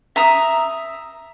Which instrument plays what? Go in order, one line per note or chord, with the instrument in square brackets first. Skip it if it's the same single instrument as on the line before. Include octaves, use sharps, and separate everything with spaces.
[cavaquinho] E5 A#5 D#6